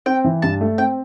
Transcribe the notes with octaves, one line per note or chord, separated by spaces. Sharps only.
C4 G5
E3
G2 A5
A3
C4 G5